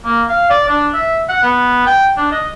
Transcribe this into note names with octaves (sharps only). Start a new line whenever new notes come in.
A#3
F5
D5
D4
E5
F#5
B3
G5
D4
D#5